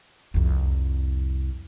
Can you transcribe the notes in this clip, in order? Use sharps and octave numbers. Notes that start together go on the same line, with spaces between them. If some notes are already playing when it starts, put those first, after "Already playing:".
C2 F2